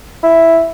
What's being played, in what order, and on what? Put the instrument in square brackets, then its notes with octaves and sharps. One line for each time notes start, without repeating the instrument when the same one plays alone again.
[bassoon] E4